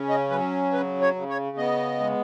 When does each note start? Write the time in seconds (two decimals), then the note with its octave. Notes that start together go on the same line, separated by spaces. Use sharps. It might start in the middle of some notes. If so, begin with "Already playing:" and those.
Already playing: C#3 C#4
0.09 D#5
0.30 F#3 B4
0.73 C#3 B4
1.01 C#5
1.15 C#3
1.29 C#5
1.57 B3 D#5
2.00 G#3